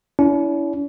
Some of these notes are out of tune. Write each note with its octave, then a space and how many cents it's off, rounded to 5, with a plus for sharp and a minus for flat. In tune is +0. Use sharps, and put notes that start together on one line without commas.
C#4 +45 E4 +0